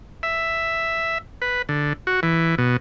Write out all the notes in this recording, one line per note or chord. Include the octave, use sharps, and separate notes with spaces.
E5
B4
D3
F#4
E3
B2